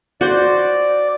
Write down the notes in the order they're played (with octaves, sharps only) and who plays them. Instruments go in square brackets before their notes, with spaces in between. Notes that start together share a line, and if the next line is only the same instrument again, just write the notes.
[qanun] F#4 C5 [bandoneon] D5